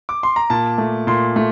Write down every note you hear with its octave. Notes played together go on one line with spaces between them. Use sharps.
D6
C6
A#5
A#2 A5
A3
A#2 C6
A3